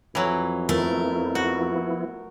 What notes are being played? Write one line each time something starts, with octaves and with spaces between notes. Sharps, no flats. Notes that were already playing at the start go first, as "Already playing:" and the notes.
F2 E3 F#3
F3 A3 B3 E4 A#4
F#4